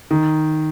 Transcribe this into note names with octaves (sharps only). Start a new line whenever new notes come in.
D#3